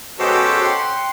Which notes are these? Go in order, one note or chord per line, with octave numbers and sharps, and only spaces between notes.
B2 G#3 C#4 F#4 G4 A4 C5
F#5 G5 C6